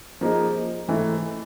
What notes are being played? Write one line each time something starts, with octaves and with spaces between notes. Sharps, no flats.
F3 A#3 D#4 G#4
G#2 E3 A3